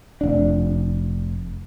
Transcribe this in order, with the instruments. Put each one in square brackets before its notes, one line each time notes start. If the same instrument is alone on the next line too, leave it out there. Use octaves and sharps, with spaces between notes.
[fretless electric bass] F1 D4